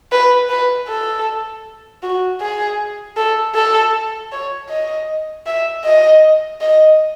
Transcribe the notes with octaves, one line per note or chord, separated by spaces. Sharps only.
B4
B4
A4
F#4
G#4
A4
A4
C#5
D#5
E5
D#5
D#5